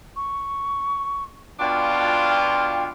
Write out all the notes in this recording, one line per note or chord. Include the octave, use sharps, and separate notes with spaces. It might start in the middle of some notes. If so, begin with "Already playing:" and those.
C#6
B2 D4 F4 G5